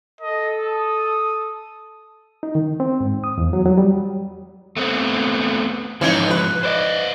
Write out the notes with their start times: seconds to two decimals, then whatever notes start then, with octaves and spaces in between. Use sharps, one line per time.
0.21 A4 D#5
0.66 D#6
2.43 D#4
2.55 D#3
2.80 C4
3.00 G#2
3.24 D#6
3.38 E2
3.53 F#3
3.65 F#3
3.78 G3
4.77 A3 B3 C4
6.01 G#2 E3 F3 D#4 C#5
6.30 B4
6.63 C5 D5 D#5